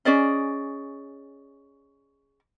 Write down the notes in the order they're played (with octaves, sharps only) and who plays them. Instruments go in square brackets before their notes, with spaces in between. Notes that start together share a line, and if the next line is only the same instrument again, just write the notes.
[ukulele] C#4 G#4 D5 D#5